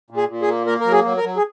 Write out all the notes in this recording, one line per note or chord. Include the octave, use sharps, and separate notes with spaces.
A#2
G#4
A#2
G#4
A#3
A#3 A#4
F#3 A#4
G#4
F#3
A#4
F#3
G#4